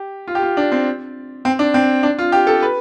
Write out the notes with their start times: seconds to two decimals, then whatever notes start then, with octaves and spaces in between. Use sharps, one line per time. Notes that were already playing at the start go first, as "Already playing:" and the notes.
Already playing: G4
0.27 F4
0.35 G4
0.43 F4
0.57 D4
0.72 C4
1.45 C4
1.59 D4
1.74 C4
2.03 D4
2.19 F4
2.32 G4
2.47 A4
2.62 B4